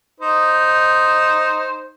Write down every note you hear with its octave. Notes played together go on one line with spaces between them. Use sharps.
D#4 C5